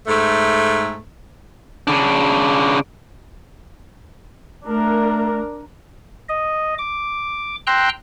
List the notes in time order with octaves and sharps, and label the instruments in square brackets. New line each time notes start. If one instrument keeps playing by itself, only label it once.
[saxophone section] G#2 A3
[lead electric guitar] C#3 D4
[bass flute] A3 [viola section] D4 A#4
[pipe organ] D#5
D6
G5 A#5 C6 E6 F#6